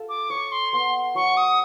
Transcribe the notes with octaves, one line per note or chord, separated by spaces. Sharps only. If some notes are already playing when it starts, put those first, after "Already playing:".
Already playing: F4 A4
D6
C#5 C#6
C6
B3 C6
F#3 C#6
D#6